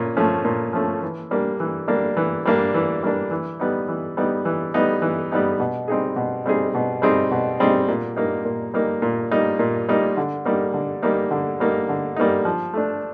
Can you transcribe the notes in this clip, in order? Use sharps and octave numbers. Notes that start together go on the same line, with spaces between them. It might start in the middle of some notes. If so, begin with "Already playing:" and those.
Already playing: A#2 C#4
F3 A3 C#4
A#2
F3 A3 C#4
E3
G3 A#3 D4
E3
G3 A#3 D4
E3
G3 A#3 D4
E3
G3 A#3 D4
E3
G3 B3 D#4
E3
G3 B3 D#4
E3
G3 B3 D#4
E3
G3 B3 D#4
B2
G3 C4 D#4 G#4
B2
G3 C4 D#4 G#4
B2
G3 C4 D#4 G#4
B2
G3 C4 D#4 G#4
A#2
G3 A#3 D#4
A#2
G3 A#3 D#4
A#2
G3 A#3 D#4
A#2
G3 A#3 D#4
D3
G3 A#3 D#4
D3
G3 A#3 D#4
D3
G3 A#3 D#4
D3
G3 A#3 D#4
F3
A3 D4